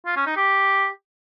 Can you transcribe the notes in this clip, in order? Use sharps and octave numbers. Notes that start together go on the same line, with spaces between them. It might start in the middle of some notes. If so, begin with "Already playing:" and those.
F4
C#4
D#4
G4